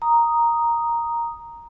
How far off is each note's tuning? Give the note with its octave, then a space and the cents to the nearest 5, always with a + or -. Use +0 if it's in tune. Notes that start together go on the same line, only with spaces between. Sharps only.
A#5 +0 D#6 +0